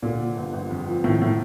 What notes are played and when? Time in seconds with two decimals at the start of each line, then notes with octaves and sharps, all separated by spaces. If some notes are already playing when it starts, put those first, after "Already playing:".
0.02 A#2 D3
0.20 F3
0.37 G1
0.53 G1
0.71 F2
0.88 F3
1.04 A2 D#3
1.21 A2 D#3